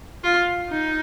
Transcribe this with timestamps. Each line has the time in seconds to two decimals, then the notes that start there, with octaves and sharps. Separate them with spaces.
0.24 F4
0.69 D#4